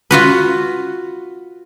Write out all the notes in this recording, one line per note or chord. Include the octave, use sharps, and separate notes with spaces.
F4 F#4 B4